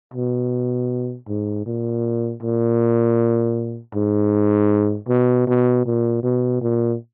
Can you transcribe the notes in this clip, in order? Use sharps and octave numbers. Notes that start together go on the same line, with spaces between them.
B2
G#2
A#2
A#2
G#2
B2
B2
A#2
B2
A#2